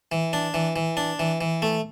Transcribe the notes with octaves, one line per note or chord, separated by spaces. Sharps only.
E3
D4
E3
E3
D4
E3
E3
A3